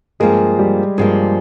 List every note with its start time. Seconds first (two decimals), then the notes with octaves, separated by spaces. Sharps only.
0.20 G2 F3 G#3 A#3 G#4
0.59 G3 G4
0.98 G2 F3 G#3 A#3 G#4